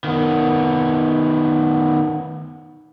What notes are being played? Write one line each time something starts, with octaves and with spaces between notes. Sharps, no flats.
D#3 B3